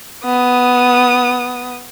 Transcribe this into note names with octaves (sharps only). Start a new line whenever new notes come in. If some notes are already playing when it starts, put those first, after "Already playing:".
B3 D#6